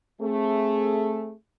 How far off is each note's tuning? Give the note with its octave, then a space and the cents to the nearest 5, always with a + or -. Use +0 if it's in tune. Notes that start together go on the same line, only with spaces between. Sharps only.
A3 +0 C4 +25 G#4 +0